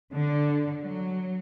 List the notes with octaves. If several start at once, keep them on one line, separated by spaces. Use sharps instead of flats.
D3
F#3